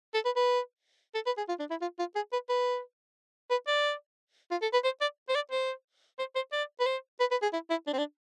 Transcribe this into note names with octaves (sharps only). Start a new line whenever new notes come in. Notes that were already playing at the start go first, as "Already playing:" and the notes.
A4
B4
B4
A4
B4
G#4
F4
D4
E4
F4
F4
G#4
B4
B4
B4
D5
F4
A4
B4
C5
D5
C5
D5
C5
C5
C5
D5
B4
C5
B4
B4
G#4
E4
E4
D4
C4
D4